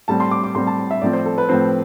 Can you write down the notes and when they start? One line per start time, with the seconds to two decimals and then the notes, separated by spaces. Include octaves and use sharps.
0.08 A2 G3 C4 A5
0.20 C6
0.31 D6
0.44 D6
0.55 A2 G3 C4 C6
0.67 A5
0.91 E5
1.01 A2 F3 C4 D5
1.13 C5
1.26 A4
1.38 B4
1.49 A2 F3 C4 C5